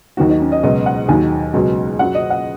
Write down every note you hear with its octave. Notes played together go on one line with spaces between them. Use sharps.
D#2 D#3 F#3 F#4
D#4
C#4
D#5
C#2 B2 F#3 D#5
F#5
D#2 D#3 F#3 G#5
C#2 B2 F#3
F#2 C#3 F#3 F#5
D#5
F#5